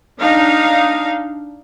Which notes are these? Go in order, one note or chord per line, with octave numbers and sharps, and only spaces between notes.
D4 D#4 F5